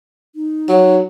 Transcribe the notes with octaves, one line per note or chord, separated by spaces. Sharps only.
D#4
F#3